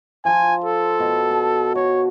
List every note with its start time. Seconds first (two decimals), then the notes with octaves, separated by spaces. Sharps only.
0.25 F3 G#5 A5
0.64 A4
1.00 B2
1.31 A5
1.75 F#4 C#5